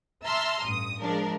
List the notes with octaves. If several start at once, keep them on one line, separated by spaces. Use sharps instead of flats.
E5 A5 A#5 C6 E6 F6
A1 G2 D#6
F3 G#3 D4 A#4